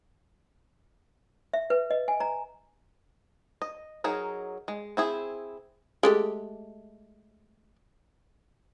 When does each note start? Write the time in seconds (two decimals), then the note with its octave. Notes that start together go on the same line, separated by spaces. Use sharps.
1.53 E5
1.70 B4
1.91 D#5
2.08 G#5
2.20 A#5
3.62 D#5
4.04 F#3 D#4 G#4 A#4
4.68 G#3
4.97 C4 E4 G#4
6.03 G#3 A3 G4